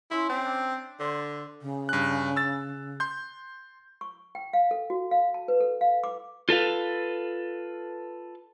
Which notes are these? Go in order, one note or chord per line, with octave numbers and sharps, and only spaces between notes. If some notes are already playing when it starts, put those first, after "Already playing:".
C#4 E4 E5 C6
C4
D4
D3 C5
C#3
G2 F#6
E6 A6
C6 G6
C#6
G5
F5
A4
F#4
F5
A5
B4
A4
F5
D6
F4 A4 B4 F5